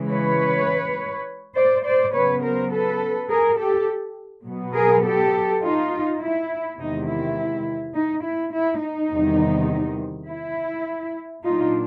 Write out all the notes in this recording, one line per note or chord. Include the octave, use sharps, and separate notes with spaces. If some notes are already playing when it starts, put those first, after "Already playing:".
Already playing: C#3 E3 G#3
B4 C#5
C5 D5
C5 D5
C#3 F#3 B3 B4 C#5
A#4 C5
A4 B4
G#4 A#4
G4 A4
B2 F#3 B3
G#4 A#4
G4 A4
D#4 F4
E4
E2 C3 D#3 G#3 D#4
E4
D#4
E4
E4
D#4
E2 C3 D#3 G3
E4
A#2 F#3 A#3 D4 D#4 F4